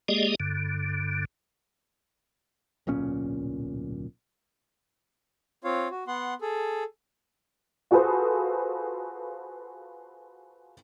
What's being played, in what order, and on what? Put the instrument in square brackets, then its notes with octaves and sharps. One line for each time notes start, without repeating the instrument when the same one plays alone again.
[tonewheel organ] G#3 A#3 G4 G#4 D5 D#5
G2 D3
[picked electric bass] D1 B1 A#2 C#4
[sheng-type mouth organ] C4 F4 C#5 F5
F#4
B3 F#5 C6
G#4 A4
[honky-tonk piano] F4 F#4 G#4 A4 B4 C5